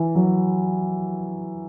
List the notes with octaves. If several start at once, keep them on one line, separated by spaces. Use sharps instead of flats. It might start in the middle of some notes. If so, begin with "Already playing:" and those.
Already playing: E3
F#3